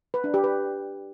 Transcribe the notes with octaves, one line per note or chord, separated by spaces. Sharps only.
B4
D4
G4
B4